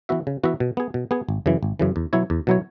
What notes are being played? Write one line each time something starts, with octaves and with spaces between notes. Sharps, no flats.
E3 B3 F#4 E5
C#3
E3 B3 F#4 E5
B2
B3 G#4
B2
B3 G#4
G#1
F#2 C#3 E3
G#1
F#2 C#3 E3
E2
B2 F#3 E4 C#5
E2
B2 F#3 E4 C#5